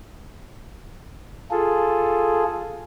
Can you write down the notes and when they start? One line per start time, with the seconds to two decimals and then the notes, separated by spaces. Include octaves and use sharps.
1.51 F4 G#4 A4